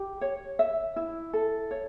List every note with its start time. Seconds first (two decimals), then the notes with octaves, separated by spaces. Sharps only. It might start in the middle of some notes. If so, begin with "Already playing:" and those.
Already playing: G4
0.21 C#5
0.59 E5
0.96 E4
1.33 A4
1.71 C#5